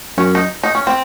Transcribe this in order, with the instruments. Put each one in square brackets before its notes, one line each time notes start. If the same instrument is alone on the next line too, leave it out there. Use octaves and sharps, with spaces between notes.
[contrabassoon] F#2 [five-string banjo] C#4
[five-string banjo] D#4
D#4
C#4
C4